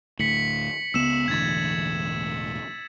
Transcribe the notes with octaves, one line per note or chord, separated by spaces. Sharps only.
D2 A2 B6 C#7 F#7
C#2 B3 E6 E7
E1 A1 D3 G#6 A6